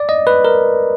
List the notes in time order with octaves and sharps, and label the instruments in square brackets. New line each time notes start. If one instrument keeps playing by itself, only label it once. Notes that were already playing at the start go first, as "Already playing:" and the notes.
Already playing: [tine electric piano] D5
D#5
B4
A#4